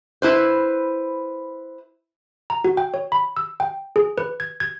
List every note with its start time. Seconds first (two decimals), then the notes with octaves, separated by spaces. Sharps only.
0.22 E4 B4 C5
2.50 A#5
2.64 F#4
2.77 G5
2.94 C#5
3.12 B5
3.37 E6
3.60 G5
3.96 G#4
4.18 B4
4.40 G#6
4.60 G#6